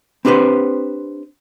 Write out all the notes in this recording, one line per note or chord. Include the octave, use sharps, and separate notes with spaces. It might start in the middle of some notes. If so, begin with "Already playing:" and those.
C4 D4 G4 B4 C5